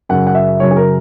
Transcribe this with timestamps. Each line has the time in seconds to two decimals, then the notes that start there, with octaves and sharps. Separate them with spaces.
0.09 F#2 C#3 F#3 F#5
0.27 F#5
0.35 E5
0.60 F#2 C#3 F#3 C#5
0.71 G#4
0.77 A#4